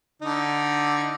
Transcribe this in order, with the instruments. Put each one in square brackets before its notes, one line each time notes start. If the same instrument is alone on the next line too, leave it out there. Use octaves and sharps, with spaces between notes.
[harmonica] D3 D#4